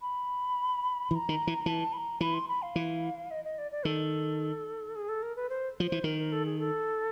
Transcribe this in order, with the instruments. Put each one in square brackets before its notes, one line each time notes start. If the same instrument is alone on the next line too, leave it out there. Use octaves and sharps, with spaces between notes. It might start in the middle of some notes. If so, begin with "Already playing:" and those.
[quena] B5
[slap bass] E3 [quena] B5
[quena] A#5
[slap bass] D#3
E3
[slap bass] E3 [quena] A5
[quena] B5
A#5
[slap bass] E3 [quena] B5
[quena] C6
B5
F5
[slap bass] E3
[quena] D#5
D#5
D5
D5
[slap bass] D#3 [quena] A4
[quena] G#4
A4
A#4
B4
C5
[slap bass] F3
[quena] C5
[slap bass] E3
[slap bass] D#3 [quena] A#4
[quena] A#4
A4
G#4
A4